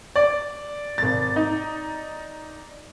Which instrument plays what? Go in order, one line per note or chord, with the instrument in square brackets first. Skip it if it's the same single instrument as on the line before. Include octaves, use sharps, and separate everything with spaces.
[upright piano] D5
[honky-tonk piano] G#1 A6
D#4